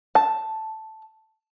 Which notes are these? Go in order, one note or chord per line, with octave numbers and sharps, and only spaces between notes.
A5